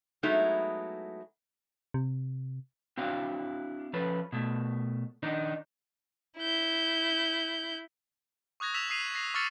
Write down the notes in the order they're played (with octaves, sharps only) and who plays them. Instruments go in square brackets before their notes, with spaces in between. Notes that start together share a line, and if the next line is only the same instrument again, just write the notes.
[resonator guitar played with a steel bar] F#3 G#3 A3 B3 D#4 E4
[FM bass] C3
[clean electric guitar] C4 D4 E4 F#4 F5
F3 C#4 A4 B4
B2 A3
D#3 D4 D#4
[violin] E4 G6
[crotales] C#6 D#6 F#6 G#6 A#6
E6 B6 E7 F7
D#6 B6 C7 D#7 F7
A#6 C7
C#6 D6 E6 F6 A6 C#7